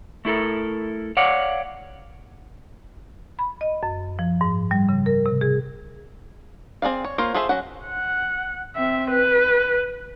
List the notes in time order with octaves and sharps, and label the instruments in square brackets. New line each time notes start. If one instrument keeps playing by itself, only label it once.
[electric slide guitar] A3 E4 A4 A#4
C#5 D5 F5 F#5
[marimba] B5
D#5
F#2
F3
G#2
G3
C#3
A#4
C3
G#4
[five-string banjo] C4 G#4 D5 F5
C#5
A#3 F4 A#4 C5 C#5
F4 G#4 A4 C5 E5
F#3 C#4 F#4 F#5
[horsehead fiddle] F#5
C4 E5
B4